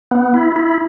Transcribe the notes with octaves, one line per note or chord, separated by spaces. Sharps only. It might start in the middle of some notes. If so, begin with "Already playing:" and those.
B3
E4
E4